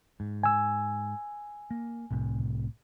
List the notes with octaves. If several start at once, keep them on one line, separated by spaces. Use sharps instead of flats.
G#2
G#5 E6
A#3
C2 A2 C3